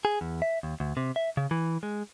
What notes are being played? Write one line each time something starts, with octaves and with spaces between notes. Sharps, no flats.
G#4
E2
E5
D#2
D2
C3
E5
C#3
E3
G#3